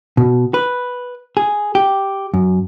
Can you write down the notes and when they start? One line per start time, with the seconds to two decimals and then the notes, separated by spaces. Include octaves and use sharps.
0.17 B2
0.54 B4
1.37 G#4
1.75 G4
2.34 F#2